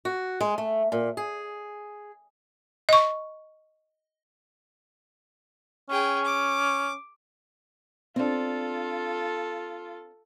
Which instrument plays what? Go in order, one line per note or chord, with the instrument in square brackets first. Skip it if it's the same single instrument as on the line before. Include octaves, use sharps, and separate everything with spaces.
[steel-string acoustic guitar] F#4
G#3
A3
A#2
G#4
[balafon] D#5 C#6
[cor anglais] C#4 [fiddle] G#4 G5
[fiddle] D6
[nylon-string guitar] C4 D4 [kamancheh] F4 A4